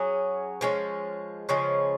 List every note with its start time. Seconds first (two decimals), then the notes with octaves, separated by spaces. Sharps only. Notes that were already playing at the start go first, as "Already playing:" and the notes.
Already playing: F#3 C#4 G#4
0.61 F3 G#3 C#4
1.49 C#3 F3 G#3 C#4